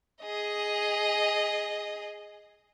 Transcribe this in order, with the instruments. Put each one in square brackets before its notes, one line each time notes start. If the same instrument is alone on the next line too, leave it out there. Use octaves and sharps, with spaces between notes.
[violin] G#4 D#5